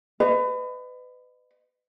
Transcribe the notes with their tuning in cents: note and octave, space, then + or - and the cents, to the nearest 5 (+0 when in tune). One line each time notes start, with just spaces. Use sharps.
B4 +30 D#5 -30